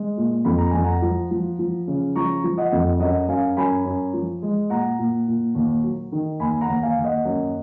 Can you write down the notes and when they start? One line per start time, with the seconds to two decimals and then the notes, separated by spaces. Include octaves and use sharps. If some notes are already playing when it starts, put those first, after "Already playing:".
Already playing: G#3
0.17 A#2
0.45 F2 B5
0.58 A#5
0.71 F2 G#5
0.84 F#5 A#5
1.02 F3
1.31 F3
1.59 F3
1.87 C#3
2.16 F3 A#5 C#6
2.44 F3
2.58 D#5 F#5
2.72 F2
3.00 F#2 D#5 F#5
3.28 F#2 F5 G#5
3.57 F#2 G#5 B5
3.85 F#2
4.13 F3
4.42 G#3
4.70 A#2 F#5 A#5
4.99 A#2
5.27 A#2
5.55 D#2
5.83 F#3
6.12 D#3
6.40 D#2 G#5 B5
6.61 F#5 A#5
6.68 D#2
6.82 F5 G#5
6.97 D#2
7.04 D#5 F#5
7.25 F#2